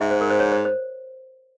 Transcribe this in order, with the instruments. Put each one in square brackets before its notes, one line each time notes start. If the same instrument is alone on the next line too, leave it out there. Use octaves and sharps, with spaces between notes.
[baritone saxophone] G#2 [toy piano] E5
[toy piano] C5
A#4
C5
C#5
C5
C5